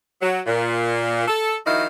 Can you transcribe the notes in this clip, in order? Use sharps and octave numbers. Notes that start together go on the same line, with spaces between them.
F#3
A#2
A4
D#3 F3 E4 F#4 D#5 F5